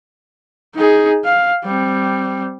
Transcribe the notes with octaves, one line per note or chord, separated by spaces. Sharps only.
D#4 G#4
F5
G3 C4